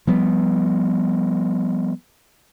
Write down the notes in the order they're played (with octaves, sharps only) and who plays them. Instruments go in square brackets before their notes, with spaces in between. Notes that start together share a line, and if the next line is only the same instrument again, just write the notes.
[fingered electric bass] F3 G3 B3